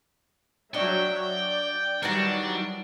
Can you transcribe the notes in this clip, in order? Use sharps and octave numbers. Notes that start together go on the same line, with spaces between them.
F#3 D4 F#4 C#5 D#5 E5 G5
D5
D#3 E3 F#3 G3 D4 D#4 F#4